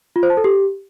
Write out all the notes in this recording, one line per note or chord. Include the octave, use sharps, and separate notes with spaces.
F4
C5
A5
A4
G4